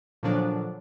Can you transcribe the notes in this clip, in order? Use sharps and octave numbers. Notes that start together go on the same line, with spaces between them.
A#2 D3 F3 F#3 D4